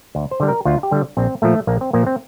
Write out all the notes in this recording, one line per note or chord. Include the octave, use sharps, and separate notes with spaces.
D2
C5
D3 G3
A#4
D2 F4
G4
D3 G3
A#1 C4
A#2 F3 A3
A#1 A#3
C4
A#2 F3 A#3
C4